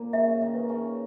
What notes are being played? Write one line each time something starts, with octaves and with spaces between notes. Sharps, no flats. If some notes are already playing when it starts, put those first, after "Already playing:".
Already playing: A#2 A#3
C#3 C#4 E5
D#3 D#4
B4
C#3 C#4